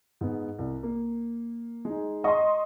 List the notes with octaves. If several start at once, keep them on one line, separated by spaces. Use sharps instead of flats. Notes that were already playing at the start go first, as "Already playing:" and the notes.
G#2 B3
C2
A#3
G#3 D#4
D#5 A#5 C6 C#6